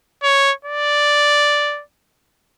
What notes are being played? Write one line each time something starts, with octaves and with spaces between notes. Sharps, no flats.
C#5
D5